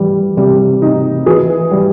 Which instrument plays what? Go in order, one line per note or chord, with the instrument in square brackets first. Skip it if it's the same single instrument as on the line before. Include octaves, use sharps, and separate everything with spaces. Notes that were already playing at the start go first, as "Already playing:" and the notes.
Already playing: [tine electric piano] E3 [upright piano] G3
[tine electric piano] C3 [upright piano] G3
[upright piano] D#4
[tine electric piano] E3 [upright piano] G#4
[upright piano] G3